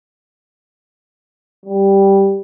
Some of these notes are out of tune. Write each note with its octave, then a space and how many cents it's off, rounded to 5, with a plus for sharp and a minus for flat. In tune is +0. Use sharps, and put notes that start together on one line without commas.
G3 +0